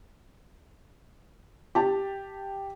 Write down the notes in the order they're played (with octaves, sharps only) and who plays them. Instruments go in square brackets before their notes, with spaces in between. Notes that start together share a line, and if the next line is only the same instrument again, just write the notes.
[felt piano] G4 A5